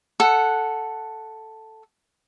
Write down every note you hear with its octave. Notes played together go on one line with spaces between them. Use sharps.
A4 F#5